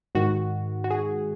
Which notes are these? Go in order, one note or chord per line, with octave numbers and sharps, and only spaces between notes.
G#2 D#3 F#4
F#4
G#4